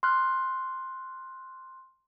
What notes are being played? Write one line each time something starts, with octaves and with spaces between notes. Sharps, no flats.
C6 F6 F#6